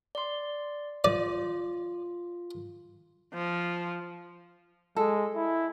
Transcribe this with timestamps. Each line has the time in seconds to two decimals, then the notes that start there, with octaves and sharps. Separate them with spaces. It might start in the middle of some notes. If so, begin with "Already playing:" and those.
0.15 D5 C6
1.04 F4 D5
3.34 F3
4.96 G#3 A4
5.35 E4